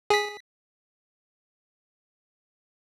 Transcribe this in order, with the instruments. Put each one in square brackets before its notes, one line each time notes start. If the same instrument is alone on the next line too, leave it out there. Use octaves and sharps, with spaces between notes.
[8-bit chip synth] G#4 B6